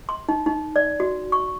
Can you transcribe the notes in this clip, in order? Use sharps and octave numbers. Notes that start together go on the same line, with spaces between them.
C6
D#4
D#4
D5
F#4
C#6